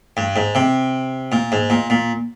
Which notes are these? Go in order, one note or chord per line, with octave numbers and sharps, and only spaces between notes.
G2
G#2
C3
A#2
G#2
A#2
A#2